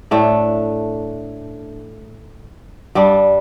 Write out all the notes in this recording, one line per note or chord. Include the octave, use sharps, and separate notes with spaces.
A2 A3 D4
G2 G3 D4